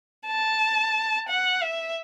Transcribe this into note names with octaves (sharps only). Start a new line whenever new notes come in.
A5
F#5
E5